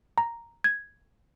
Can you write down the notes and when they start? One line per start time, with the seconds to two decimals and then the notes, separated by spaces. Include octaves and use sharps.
0.18 A#5
0.64 G#6